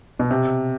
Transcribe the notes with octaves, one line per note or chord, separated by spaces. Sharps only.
B2
C3